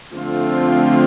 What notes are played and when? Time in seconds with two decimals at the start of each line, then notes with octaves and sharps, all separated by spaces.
0.14 D3 F3 A3 C4 F4